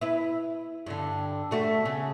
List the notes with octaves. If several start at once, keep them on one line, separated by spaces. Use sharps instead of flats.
E4 B4
G2 D3
G3 A3 F#4
C#3